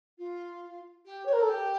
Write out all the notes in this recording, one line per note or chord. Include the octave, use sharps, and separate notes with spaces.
F4
G4
C#5
A#4
A4
G4